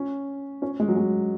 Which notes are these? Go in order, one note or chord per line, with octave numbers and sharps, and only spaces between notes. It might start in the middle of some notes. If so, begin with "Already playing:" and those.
Already playing: C#4
C#4
G#3
F#3
G#3